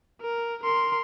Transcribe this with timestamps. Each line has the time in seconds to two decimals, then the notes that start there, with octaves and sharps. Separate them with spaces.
0.22 A#4
0.64 A#4 C6